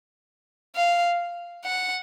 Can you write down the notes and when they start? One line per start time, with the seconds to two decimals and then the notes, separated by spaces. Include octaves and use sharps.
0.76 F5
1.65 F#5